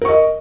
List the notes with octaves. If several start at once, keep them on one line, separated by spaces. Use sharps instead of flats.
A#4 D#5 C#6